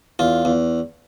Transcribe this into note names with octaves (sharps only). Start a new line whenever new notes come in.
E2 F4
E2